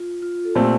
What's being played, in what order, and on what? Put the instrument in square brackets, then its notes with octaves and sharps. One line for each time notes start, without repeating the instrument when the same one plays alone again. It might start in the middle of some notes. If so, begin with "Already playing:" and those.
Already playing: [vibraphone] F4
F4
A4
[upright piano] A#2 A3 C4 [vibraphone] G4